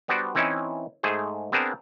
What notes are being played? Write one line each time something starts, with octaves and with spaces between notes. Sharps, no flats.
G3 B3 D4 F#4 C5 D5
E3 C4 C#4 D#4 E4
G#2 A3 G#4 C5
B3 C4 D4 G#4 A#4 C5